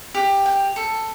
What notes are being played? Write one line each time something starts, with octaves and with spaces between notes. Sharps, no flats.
G4
G5
A4